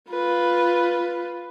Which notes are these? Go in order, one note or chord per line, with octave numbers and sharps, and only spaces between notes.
F4 B4